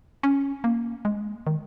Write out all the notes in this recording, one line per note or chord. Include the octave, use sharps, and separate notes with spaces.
C#4
A#3
G#3
D#3